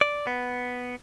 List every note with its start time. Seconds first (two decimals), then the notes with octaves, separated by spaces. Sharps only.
0.01 D5
0.27 B3